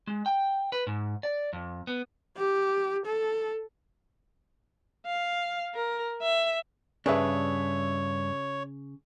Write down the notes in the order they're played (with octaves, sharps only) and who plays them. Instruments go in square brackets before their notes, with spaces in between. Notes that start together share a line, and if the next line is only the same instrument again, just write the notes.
[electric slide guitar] G#3
G5
B4
G#2
D5
F2
B3
[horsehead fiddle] G4
A4
[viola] F5
A#4
E5
[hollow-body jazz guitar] G2 D4 [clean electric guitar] C#3 [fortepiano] G#4 B4 E5 [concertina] C#5